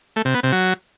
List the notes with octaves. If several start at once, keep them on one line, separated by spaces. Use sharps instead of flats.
A3
C3
B3
C3
F#3